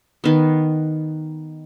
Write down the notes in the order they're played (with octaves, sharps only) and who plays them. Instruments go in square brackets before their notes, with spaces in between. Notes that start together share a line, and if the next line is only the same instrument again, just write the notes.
[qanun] D#3 B3